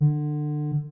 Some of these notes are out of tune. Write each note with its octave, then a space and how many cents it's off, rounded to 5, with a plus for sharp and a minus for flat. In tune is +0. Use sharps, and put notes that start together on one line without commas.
D3 +25